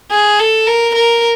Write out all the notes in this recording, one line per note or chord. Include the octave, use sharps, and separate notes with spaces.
G#4
A4
A#4
A#4